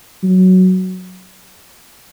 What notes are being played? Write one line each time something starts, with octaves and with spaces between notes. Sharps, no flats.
F#3